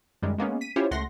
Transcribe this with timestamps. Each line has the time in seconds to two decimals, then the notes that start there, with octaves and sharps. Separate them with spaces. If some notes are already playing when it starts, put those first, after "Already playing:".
0.22 F#2 D#3 G3 G#3
0.38 G#3 A#3 B3 C#4
0.61 B6 D#7
0.76 C#4 E4 F4 G4 C5 C#5
0.91 C#2 A3 F#5 C6 A#6